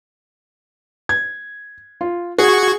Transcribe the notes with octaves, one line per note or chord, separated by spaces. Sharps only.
G#6
F4
F#4 G#4 C#6 G#6